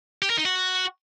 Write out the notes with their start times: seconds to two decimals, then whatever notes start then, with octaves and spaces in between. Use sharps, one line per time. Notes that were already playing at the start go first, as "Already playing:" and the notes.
0.22 G4
0.30 A#4
0.38 D#4
0.45 F#4